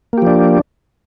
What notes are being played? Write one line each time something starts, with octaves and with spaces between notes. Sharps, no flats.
F3 A#3 D4 G4